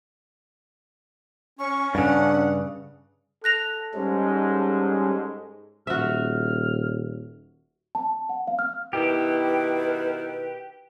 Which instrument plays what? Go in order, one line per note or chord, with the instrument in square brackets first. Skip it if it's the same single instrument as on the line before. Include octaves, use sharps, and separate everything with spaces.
[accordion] C#4 [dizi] C#6
[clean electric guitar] G2 C#3 [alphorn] D4 [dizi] F#5
[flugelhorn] A4 [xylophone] F#6 A#6 F7
[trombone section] G#2 G#3 [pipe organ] G3 C#4
[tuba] D#1 [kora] F#4 E5 [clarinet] F6
[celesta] A5
F#5
F5
F6
[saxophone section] B2 D#3 E4 [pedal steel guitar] G4 [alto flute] B4